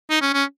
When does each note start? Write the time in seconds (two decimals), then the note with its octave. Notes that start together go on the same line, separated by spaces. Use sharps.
0.10 D#4
0.21 C#4
0.33 C#4